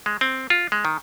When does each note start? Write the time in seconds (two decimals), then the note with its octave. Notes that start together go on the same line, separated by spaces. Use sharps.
0.06 G#3
0.21 C4
0.50 F4
0.72 G#3
0.85 D#3